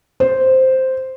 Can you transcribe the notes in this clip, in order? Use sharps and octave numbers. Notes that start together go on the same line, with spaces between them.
C5